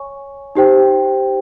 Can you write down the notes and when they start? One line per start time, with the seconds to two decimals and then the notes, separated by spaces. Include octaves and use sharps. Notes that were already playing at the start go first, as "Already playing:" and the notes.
Already playing: C#5 G#5 C#6
0.55 D#4 G4 C5 G5